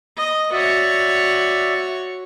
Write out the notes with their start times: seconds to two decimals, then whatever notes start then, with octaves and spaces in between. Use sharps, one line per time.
0.17 D#5
0.53 F#4 C#5 D5 E5